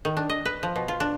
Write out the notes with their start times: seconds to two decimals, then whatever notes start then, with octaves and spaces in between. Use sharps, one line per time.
0.05 D#3
0.17 D4
0.30 D#5
0.45 B4
0.63 F3
0.76 B2
0.88 F4
1.00 D4